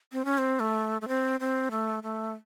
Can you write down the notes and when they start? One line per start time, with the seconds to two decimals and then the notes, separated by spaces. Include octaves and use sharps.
0.12 C4
0.25 C#4
0.38 C4
0.60 A3
1.01 A3
1.08 C4
1.40 C4
1.71 A3
2.03 A3